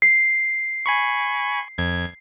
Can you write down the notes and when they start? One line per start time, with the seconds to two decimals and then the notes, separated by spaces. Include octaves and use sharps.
0.02 C7
0.86 G#5 B5 C#6
1.78 F2 G#6